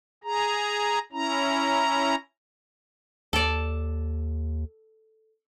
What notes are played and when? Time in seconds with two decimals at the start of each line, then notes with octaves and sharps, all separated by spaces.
0.24 G#4 A#5
1.12 C#4 E4 A#5
3.33 D#2 A4 D5